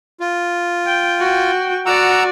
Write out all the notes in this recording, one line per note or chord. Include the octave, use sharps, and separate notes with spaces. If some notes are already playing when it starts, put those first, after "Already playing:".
F4
G5
F#4 G5
F#4 D5 F#5 A#5 E6